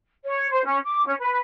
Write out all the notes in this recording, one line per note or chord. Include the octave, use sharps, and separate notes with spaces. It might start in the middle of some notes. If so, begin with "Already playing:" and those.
C#5
C5
C#4
D6
C#4
B4